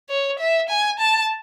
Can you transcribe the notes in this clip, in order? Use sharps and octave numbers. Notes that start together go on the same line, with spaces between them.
C#5
E5
G#5
A5